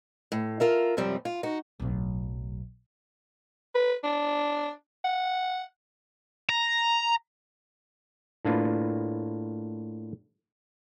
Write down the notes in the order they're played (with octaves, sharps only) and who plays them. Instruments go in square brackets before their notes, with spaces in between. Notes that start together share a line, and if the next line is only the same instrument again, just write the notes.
[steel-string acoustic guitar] A2
F4 A#4 E5
F#2 C3 F3 G3 C4
F4
D#4 F#4
[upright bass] D1 B1
[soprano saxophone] B4
D4
F#5
[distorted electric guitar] A#5
[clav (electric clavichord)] A2 A#3 D4 F4 B4